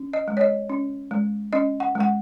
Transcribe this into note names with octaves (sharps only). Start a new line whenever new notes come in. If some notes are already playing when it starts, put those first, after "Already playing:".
Already playing: C#4
D#5
G#3
C#5
D#5
C#4
G#3
C#4 D#5
F#5
G#3
F#5